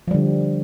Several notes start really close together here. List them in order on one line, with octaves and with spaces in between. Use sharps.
F3 G3 D3